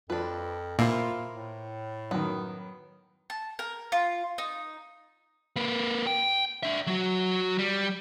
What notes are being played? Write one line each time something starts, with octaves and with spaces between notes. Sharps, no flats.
F2 F3 D4 B4
A#2 A#3 E4 F4 C5
A2
F#2 D#3 B3
A5
A#4
F4
D#4
A#3 B4
G5
D4 E5
F#3 F#4
G3